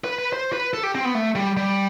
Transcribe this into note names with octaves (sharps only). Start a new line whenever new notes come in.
B4
B4
C5
B4
A4
G4
C4
B3
A3
G3
G3